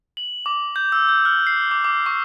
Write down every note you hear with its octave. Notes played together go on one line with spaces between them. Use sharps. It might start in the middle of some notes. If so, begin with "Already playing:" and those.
F#7
D6
G6
E6
G6
F6
C7
D6
D6
C#6